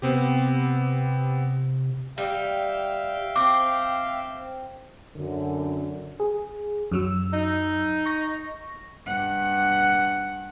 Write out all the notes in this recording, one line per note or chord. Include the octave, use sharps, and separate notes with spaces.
C3 B3 C4 G4
G3 E5 F5 G5
C4 D6
F#2 D3
G#4
F#2 F#3 E6
D#4
C#6 A#6
G2 F#5